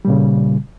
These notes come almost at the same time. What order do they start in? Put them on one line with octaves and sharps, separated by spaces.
G3 A#2 C#3